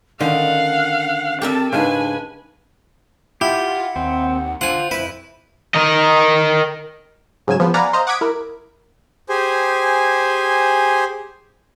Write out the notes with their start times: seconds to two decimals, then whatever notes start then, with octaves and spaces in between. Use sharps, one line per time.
0.20 D3 D#3 C#4 D4 F5 F#5
1.42 C4 G4 A4 A#4 E5 A5
1.72 G#2 C#3 D4 B4 G#5
3.41 E4 F4 G4 F#5
3.96 D#2 C4
4.61 D3 F4 C5 F#5 G#5
4.91 F2 E4 B4
5.74 A#4 D#5
7.47 G#2 C#3 F#3 G#5 E7
7.60 F3 B3
7.74 D5 F5 F#5 G#5 A#5 B5
7.93 C5 D#5 F5 A#5
8.07 F#5 D6 D#6 G#6 B6 D7
8.21 E4 A#4
9.29 G4 G#4 C5 G#5